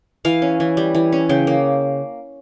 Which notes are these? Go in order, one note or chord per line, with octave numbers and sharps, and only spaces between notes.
E3 F5
C#4
E3
G3
E3
C#4
C#3 G5
A#3